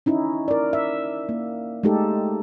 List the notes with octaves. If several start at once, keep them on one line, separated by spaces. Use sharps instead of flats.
C#4 D#4 E4
A#4 D5
E5
A#3
G#3 A3 D#4 G4 A4